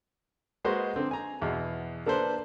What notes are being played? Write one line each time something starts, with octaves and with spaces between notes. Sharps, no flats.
G#3 A#3 F#4 B4 C5 D#5
D3 C4
G#5 A#5
E2 B2
A#3 D4 A4 B4 C5